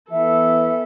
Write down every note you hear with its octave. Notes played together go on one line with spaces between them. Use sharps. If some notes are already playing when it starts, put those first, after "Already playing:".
E3 B3 A4 E5